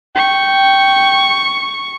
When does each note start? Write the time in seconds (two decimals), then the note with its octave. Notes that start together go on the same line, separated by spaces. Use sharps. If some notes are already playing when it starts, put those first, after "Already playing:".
0.16 G5 C#6